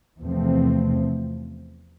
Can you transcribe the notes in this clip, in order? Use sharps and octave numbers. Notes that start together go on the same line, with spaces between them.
E2 C3 F3 A3 C4